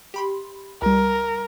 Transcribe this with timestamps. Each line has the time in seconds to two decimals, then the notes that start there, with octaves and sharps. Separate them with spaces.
0.14 G4 B5 C6
0.82 C#2 G3 A#4